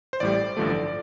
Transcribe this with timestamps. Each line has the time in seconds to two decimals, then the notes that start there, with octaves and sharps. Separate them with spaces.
0.13 C5
0.20 A1 A2 G3 D5
0.57 A1 G2 D3 F3 A3